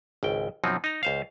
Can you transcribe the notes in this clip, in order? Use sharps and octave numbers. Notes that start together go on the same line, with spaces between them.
G#1 C#2 G5
F#2 B2 F3 F#3 C4 D#4
D#4 A#5
C#2 C5 F5